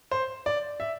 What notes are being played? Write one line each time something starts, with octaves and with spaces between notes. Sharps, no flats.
C5
D5
E5